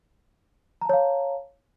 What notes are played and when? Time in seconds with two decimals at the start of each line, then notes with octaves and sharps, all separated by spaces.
0.81 A#5
0.85 A5
0.89 C#5
0.93 F5